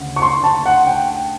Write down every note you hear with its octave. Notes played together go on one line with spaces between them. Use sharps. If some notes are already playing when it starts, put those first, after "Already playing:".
Already playing: D2 C#3
C#6
C6
A5
F#5
G5